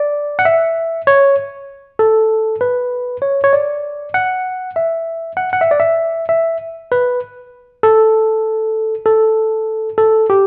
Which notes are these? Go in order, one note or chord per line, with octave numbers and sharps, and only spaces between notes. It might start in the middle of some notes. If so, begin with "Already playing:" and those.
Already playing: D5
F#5
E5
C#5
A4
B4
C#5
C#5
D5
F#5
E5
F#5
F#5
E5
D5
E5
E5
B4
A4
A4
A4
G4